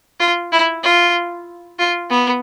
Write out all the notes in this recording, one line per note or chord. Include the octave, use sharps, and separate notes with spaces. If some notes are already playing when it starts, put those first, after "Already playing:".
F4
E4
F4
F4
B3